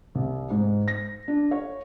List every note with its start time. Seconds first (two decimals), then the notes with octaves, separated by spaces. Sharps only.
0.15 C2
0.50 G#2
0.88 A#6
1.28 D4
1.51 C#5